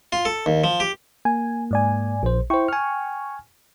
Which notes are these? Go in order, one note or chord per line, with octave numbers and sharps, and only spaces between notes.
F4
A4
D#2
F3
G4
A#3 G#5
G#2 D5 G#5
A#1 C5
E4 C5 G5 C#6
G#5 F6